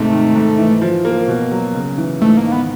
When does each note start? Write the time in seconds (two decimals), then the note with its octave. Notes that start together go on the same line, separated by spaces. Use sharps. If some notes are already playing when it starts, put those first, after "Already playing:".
Already playing: G#2 C3 A3
0.11 D#3
0.35 G#2
0.58 E3
0.81 F3
1.05 A#3
1.28 B2
1.52 F#3
1.74 C#3
1.98 E3
2.21 G#2 A3
2.37 A#3
2.44 D#3
2.52 B3